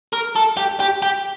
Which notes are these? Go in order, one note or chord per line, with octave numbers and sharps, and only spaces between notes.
A#4
A4
G4
G4
G4